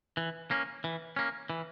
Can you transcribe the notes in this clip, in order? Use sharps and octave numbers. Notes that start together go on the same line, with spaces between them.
E3
A#3 C#4
E3
A#3 C#4
E3